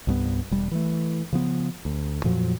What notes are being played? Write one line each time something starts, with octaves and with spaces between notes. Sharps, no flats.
C2 G2 B3
E1 G3
E3 A3
C#3 F3 B3
D2
F2 A#2 F3 F#3